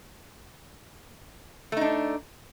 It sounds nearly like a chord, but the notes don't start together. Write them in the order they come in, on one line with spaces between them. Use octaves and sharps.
A3 D#4 D4